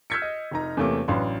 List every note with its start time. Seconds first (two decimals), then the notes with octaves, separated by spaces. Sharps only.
0.10 E6 F6 G6 G#6 B6 C#7
0.22 D#5
0.51 F1 D#4 A#5
0.77 E2 C3 A3 A#3 C#4 D6
1.08 A1 F#3 D4 B4 F5 C6